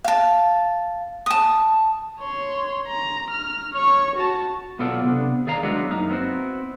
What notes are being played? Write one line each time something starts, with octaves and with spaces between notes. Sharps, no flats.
F5 A5
A5 D#6
C#5 C6
A#5
F6
C#5 C#6
F#4 A5
B1 B3 F4 A4 D5
C3 B3 D4
D#3 G#4 D5 F5 A#5
F#3 G#3 B3 D4 E4 F#4
F#2 A#3 D#4 F5
B3 C4 E4 F#4